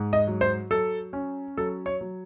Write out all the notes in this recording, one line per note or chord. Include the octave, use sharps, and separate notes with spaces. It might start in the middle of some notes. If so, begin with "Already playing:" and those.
Already playing: G#2
D#5
F#3
C5
F#3 A4
C#4
F#3 A4
C#5
F#3